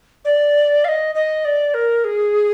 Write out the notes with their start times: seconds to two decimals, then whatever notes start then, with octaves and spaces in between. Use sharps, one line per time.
0.25 D5
0.84 F5
0.88 D#5
1.15 D#5
1.45 D5
1.74 A#4
2.04 G#4